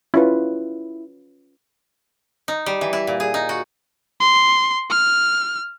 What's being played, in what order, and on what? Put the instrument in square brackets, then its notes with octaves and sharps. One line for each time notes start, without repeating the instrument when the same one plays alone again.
[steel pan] C#4 F4 B4 [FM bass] E4
[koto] D#4
G3
E3
E4
A#2
G#4
D#4
F#4
[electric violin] C6
F6